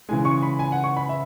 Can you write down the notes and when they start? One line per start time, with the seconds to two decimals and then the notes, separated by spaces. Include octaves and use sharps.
0.09 C#3 E3 G#3 G#5
0.25 C#6
0.42 B5
0.59 G#5
0.72 F#5
0.84 C#6
0.97 B5
1.09 E5